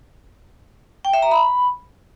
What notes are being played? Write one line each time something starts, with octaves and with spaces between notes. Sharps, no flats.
G5
E5
A#5
B5